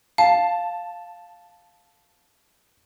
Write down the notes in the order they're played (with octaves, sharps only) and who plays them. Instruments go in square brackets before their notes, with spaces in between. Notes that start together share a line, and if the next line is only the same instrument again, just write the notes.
[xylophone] F5 [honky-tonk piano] A5